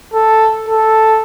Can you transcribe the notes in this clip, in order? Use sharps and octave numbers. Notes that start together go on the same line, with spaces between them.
A4
A4